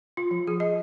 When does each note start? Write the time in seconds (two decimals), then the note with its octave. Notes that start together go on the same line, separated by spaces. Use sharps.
0.17 F4
0.31 F3
0.47 G#4
0.60 D#5